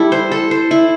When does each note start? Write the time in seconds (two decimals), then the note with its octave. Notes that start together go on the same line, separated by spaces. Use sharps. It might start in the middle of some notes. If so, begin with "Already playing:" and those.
Already playing: G3 E4 A4
0.12 C5
0.32 A4
0.51 C5
0.71 E4